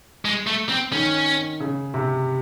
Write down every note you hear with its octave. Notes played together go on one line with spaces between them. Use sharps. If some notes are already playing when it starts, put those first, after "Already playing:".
G#3
A3
C4
D#3 C#4
C#3
C3